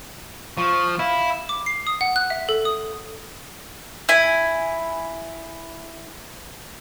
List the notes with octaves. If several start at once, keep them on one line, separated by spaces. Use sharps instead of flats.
F3 C#6
E4 F5
D6
C7
D#6
F#5
F#6
E5
A4
D#6
E4 G#5